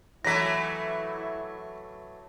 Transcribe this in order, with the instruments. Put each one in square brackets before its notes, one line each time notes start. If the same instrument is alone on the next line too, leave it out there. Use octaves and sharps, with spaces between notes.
[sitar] E3 F#3 A3 [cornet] E4 [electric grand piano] A#6 B6